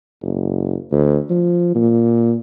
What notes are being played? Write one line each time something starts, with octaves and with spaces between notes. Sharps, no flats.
F#1
D2
F3
A#2